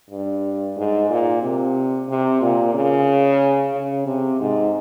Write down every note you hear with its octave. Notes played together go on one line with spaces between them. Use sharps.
G2
G#2
A#2
C3
C3
A#2
C#3
C#3
C3
G#2